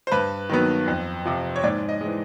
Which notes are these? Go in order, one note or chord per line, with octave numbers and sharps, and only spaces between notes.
C5
G2 B4
D#3 F#3 B3
F2
C3 F3
C#5
G#2 D5
D#5
E3 G#3